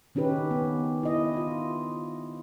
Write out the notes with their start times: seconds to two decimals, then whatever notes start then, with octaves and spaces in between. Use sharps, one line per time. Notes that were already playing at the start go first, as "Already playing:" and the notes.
0.15 D#3 C#4 D#4 G4 B4
0.51 B3
1.03 E4 D#5
1.37 F4